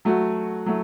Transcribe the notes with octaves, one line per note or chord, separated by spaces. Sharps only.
F#3 A3 F#4
F#3 A3